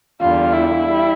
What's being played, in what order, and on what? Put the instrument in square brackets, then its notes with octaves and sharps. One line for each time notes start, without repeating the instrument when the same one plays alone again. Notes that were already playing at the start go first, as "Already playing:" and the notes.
[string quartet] E2 D3 G3 [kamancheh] F4
[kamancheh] E4
[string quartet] G3